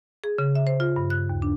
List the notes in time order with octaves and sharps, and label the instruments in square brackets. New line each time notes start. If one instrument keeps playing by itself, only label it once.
[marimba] G#4
C#3
E5
C5
F4
G2
F#6
D#2
D4